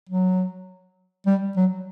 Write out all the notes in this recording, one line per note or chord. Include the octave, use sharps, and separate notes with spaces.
F#3
G3
F#3